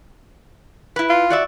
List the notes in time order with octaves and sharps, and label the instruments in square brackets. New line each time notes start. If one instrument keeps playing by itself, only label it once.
[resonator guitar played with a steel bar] E4 B4
[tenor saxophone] F4
[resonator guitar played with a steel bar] F#4 D5 E5